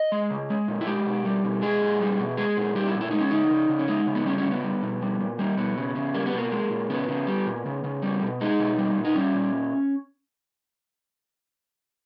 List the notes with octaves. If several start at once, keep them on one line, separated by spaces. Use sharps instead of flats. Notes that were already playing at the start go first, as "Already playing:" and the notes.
Already playing: D#5
G#3
C#3
G#3
A#2
E4
G#3 G4
B2
G3
B2
G#3 G#4
A#2
G3
B2
G#3 G#4
A#2
G3 G4
E4
A#2
E4
G#3 D#4
C#4
C#3 D#4
C#3
C#3
C#4
G#3 D#4
C#3
B3
G3 C#4
C#4
C#3
B3
G3
B2
G3
A#2
G3 A#3
B2 B3
C#3
C#3
G3 A#3
B3
B2 A#3
G#3
A#2
C#3 B3
C#3
G3
A#2
C#3
C#3
G3
B2
G#3 D#4
B2
G3
A#2
D#4
G3 C#4
A#2